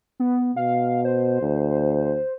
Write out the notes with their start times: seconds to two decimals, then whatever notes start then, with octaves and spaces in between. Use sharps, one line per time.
0.20 B3
0.56 B2 F5
1.05 C5
1.42 D2